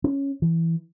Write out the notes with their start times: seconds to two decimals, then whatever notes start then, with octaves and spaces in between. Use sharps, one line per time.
0.04 C#4
0.42 E3